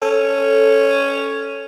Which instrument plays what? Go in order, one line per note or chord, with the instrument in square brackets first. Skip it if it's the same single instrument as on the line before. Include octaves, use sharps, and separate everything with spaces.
[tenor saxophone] C#4 [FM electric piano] A4